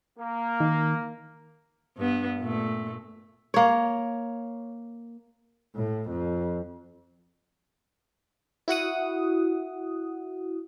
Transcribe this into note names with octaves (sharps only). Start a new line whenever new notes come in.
A#3
D#3
G2 B3
A#2 A3
A#3 C#5
A2
F2
E4 F#4 F#5 D#6